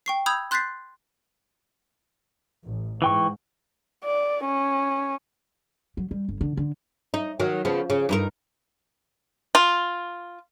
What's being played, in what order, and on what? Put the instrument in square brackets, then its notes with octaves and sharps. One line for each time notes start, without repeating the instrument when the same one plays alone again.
[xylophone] G5 C#6 C7
B5 D#6 E6 G6 G#6 F7
C6 F#6 G6 A6 B6 C7
[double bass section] A1
[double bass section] G#2 [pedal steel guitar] E3 G5 C#6
[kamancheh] D5
C#4
[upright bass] F#3
G3
G1
D3
D3
[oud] D#4
D#3 F#3
C#3 F3 B3
C#3
G2 D#4 A#4
[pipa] F4